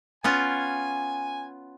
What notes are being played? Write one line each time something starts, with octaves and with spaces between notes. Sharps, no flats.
B3 C#4 F4 G#5